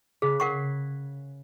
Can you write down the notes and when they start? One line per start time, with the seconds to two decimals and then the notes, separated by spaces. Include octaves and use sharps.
0.22 C#3 G#4 F#6 B6
0.40 A#4 F#5 C#6 G#6 B6 C7